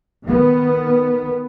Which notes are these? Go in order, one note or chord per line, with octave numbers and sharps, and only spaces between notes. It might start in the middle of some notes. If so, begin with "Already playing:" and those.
D#3 B3